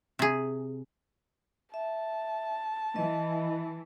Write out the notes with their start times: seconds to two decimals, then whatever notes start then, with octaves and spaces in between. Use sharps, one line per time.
0.19 C3 G#4
1.74 E5 A5
2.96 E3 D#5